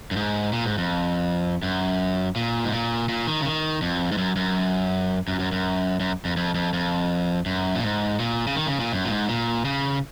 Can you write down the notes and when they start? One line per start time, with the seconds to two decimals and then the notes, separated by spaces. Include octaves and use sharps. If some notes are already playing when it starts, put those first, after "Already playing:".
0.11 F#2
0.16 G#2
0.53 A#2
0.65 G#2
0.78 F2
1.63 F#2
2.36 A#2
2.65 G#2
2.72 A#2
3.09 A#2
3.27 D#3
3.41 C#3
3.45 D#3
3.82 F2
4.12 G#2
4.18 F#2
4.36 F#2
5.28 F#2
5.40 F#2
5.52 F#2
6.00 F#2
6.25 F2
6.37 F2
6.55 F2
6.73 F2
7.46 F#2
7.75 A#2
7.83 G#2
8.20 A#2
8.47 C#3
8.56 D#3
8.68 C#3
8.80 A#2
8.93 F#2
9.05 A#2
9.10 G#2
9.29 A#2
9.65 C#3